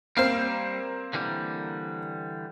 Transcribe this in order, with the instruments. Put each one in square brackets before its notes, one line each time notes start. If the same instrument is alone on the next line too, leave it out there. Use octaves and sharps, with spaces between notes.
[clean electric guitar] G3 F5 [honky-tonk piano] A#3 C4 C5
[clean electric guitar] D3 E3 G3